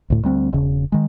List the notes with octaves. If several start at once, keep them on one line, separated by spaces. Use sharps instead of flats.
D2 A2
D2 G3 C4
E1 C#3
D#3 G#3